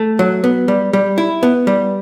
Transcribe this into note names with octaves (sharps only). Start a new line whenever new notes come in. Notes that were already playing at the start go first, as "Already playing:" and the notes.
Already playing: A3
F#3
B3
G3
G3
E4
B3
G3